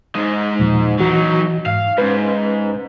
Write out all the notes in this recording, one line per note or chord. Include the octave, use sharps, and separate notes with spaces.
G#2 G#3
D#2 A#2 F3
E3 F#3 D#4 F#4
G#2 F5
G#2 C#4 B4